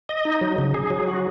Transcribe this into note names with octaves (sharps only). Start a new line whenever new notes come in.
D#5
D#4
F#3
C#3
G#4
F#3
F#4